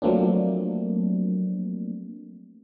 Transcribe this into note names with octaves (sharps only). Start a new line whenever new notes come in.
F3 F#3 A3 A#3 C4 D4